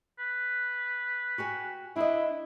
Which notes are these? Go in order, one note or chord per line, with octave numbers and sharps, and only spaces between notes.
B4
F#4 G4 G#5
D4 E4 D#5